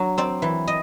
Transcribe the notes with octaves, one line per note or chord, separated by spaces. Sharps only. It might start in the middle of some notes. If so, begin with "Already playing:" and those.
Already playing: F#3 D4
C4 D5
E3
D#5